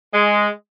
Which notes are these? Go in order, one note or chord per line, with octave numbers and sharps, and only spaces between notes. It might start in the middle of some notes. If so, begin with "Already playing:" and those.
G#3